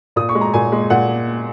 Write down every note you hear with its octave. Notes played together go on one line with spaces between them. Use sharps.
A#2 D#6
C#6
G#3
A#5
A#2 G#5
G#3
A#2 F#5